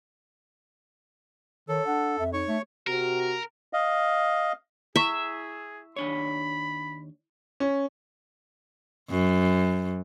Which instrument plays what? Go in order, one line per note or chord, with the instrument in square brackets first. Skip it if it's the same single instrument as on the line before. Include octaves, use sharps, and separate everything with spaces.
[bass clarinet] D#3 [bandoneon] A4 [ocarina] C#5
[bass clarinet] D4 [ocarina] F#5
[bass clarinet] F2 [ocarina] E5
[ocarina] D#4 [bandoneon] C#5 C#6
[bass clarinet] A3
[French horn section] C3 F#4 [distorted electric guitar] A#4
[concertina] D#5 F5
[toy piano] E4 C#6 [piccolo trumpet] G#4 [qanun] E5
[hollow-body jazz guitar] D#2 D4 C#5 [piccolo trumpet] B5
[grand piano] C#4
[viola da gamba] F#2